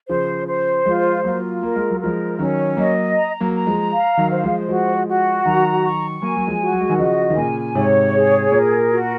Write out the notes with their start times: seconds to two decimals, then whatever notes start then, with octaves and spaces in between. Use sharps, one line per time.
0.08 C#3 F3 C5
0.47 C5
0.85 F3 G#3 F4
1.24 F#3 A#3 F4
1.63 A#3 A#4
1.76 G#3
1.90 F#3
2.00 F3 G#3 A#4
2.39 D#3 F#3 C#4
2.77 F#3 A#3 D#5
3.16 A#5
3.41 F#3 A#3
3.53 A#5
3.67 F3 G#3
3.92 F5
4.17 D#3 F#3
4.30 C5
4.43 F3 G#3
4.69 F3 G#3 F#4
5.08 F#4
5.46 D#3 F#3 A#5
5.84 C#6
6.22 F#3 A#3 G#5
6.36 F#3
6.47 F3 G#3
6.61 F#4
6.73 F#3
6.81 G#3
6.89 D#3 F#3
6.99 C#3 F3 D#5
7.30 D#3
7.36 A#2 C#3 G#5
7.75 G#2 C3 C#5
8.14 G#4
8.51 A#2 A#4
8.91 F#4